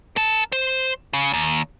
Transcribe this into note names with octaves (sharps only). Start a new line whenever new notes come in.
A#4 A5
C5
C#3
D#2